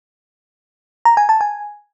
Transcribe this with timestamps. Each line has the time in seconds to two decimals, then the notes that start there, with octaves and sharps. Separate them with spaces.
1.05 A#5
1.17 G#5
1.29 A5
1.41 G#5